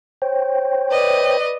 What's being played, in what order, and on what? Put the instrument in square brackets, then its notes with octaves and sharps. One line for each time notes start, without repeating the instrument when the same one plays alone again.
[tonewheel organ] C5 C#5 G5
[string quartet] B4 D5 D#5